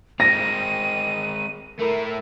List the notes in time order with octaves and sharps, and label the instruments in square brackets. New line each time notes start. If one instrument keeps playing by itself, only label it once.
[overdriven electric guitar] G#3 C4 [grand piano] A#6 [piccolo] D#7
[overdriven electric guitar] A3 E4 [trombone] A#4